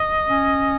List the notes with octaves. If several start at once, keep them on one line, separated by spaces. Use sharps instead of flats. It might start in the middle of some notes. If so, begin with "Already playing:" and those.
Already playing: D#5
C#4